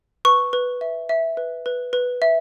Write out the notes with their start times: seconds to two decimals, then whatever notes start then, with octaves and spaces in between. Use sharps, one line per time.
0.25 B4 C#6
0.53 B4
0.81 E5
1.09 E5
1.37 B4
1.66 B4
1.93 B4
2.22 E5